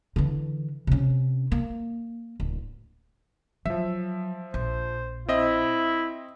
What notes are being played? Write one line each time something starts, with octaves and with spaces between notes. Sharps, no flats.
D3 E3
C3 C#4
A#3
D1
F3 F#3 E5
A#1 C5
C4 E4 D#5 E5